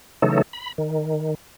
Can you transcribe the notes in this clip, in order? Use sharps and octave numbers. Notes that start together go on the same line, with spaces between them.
C#3 E3 F#3 A3 D#4 A4
B5
D#3